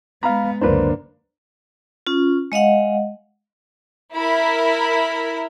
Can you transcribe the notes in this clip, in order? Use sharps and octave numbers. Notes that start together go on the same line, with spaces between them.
G#3 B3 F5 A#5 B5
C#2 F#2 D3 A#3 D4 B4 C5
C#4 F4
G#3 D#5 F5 F#5
E4 A#4 B5